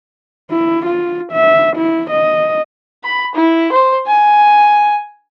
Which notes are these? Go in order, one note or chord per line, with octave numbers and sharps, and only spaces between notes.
E4
F4
E5
E4
D#5
B5
E4
C5
G#5